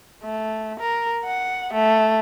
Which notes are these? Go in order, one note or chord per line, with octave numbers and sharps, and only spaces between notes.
A3
A#4
F#5
A3